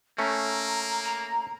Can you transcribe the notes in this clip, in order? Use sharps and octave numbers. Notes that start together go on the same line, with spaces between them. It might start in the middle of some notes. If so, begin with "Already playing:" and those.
A3 A#3 C#4 A#5
A#5